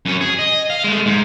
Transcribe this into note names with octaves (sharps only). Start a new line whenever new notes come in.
F#2 C#4
G#4
D#5
F5
G#3 A3
G#2